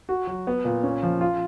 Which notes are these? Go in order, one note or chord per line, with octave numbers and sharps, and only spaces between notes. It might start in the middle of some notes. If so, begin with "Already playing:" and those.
F#4
F#3
B3
A#2
C#4
F3
F4